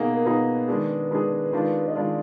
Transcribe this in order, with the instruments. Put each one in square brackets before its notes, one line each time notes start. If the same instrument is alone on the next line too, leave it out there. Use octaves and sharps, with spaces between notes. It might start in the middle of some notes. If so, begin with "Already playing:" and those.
Already playing: [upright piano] B2 A#3 D#4 G#4
[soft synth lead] A#4
[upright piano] B2 A#3 D#4 G#4 [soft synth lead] B4
[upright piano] D#3 G#3 D4 G#4
D#3 G#3 D4 G#4
D#3 G#3 D4 F4
[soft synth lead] D#5
[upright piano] D#3 G#3 D4 F4 [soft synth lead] D5